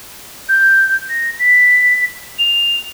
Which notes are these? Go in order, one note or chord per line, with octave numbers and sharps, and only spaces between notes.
G6
A#6
B6
F7